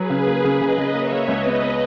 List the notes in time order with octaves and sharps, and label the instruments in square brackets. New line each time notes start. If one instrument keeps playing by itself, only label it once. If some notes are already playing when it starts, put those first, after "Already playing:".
Already playing: [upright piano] F#3 [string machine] G#4 B4
[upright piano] C#3
A#3
C#3
[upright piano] C#3 [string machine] B4 D#5
[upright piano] C#3
[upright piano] A#3 [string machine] C#5 E5
[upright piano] A#3
[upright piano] C#2 [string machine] B4 D#5
[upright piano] B3
B3